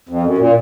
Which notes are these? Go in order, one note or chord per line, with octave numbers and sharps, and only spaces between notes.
F2
F#2
A#2